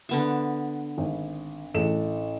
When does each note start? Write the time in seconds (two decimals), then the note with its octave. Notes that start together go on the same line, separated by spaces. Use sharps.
0.09 D3 B3 E5
0.98 G#1
1.74 A1 A4 E7